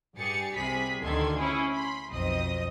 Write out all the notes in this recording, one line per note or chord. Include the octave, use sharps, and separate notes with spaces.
G2 G4 G#4 A6 C#7
C2 C3 G#4 B5 B6
D2 D3 D#3 A4 C6 G#6
C#4 E4 G#4
B5 C6
B1 F2 C4 D#5 D#6